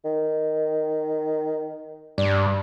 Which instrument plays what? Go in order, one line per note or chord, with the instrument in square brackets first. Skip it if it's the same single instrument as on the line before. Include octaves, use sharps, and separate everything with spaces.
[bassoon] D#3
[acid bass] G2 [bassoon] D4